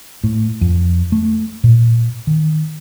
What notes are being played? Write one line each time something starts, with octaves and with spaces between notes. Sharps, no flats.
A2
F2
A3
A#2
D#3